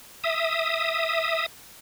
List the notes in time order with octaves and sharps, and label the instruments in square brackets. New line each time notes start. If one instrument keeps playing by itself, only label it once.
[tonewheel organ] E5 D#6